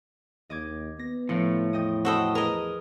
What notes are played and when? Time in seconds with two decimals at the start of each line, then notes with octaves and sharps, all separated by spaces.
0.50 D#2 D#5 D6 G#6
0.99 B3 A#6
1.29 A2 F3 A3 C#7
1.73 E2 D#5 G5 D#6
2.05 F#4 A4 C5 D#5 G5 B5
2.35 G#4 A#4 B4 D#5